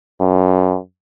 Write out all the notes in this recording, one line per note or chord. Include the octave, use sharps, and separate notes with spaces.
F#2